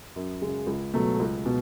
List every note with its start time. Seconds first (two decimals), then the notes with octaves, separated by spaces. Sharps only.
0.16 F#2
0.42 C#3 G#3
0.67 C#2
0.94 B2 F#3 A3
1.20 C#2
1.45 B2